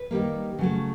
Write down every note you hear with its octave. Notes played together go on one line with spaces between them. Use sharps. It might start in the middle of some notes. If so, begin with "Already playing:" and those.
Already playing: B4
D#3 G3 A#3
C#3 F#3 A3